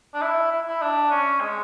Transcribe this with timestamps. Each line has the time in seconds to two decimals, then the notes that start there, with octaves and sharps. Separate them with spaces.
0.14 D4
0.22 E4
0.51 E4
0.68 E4
0.81 D4
1.11 C#4
1.41 G#3